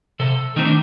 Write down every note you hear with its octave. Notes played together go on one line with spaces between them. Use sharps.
C3 A4
D#3 A3 C4 D#4
D4